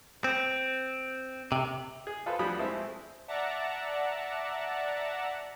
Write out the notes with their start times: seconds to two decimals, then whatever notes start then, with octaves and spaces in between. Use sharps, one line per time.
0.24 C4
1.52 C3
2.07 G#4
2.26 F4 G#4 A4 B4 C5
2.39 D2 F3 G3 B5 D#6
2.59 G#3 A3 C4 E4
3.28 D5 E5 F#5 A5 A#5